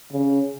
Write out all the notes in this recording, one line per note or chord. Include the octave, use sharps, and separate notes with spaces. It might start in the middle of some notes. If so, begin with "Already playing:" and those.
C#3